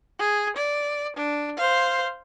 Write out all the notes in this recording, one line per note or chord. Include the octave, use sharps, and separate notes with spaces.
G#4
D5
D4
C5 F5